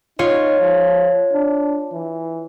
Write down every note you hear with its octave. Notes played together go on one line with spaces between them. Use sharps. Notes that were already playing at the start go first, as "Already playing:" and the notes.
D#4 F4 C#5
F3
D4
E3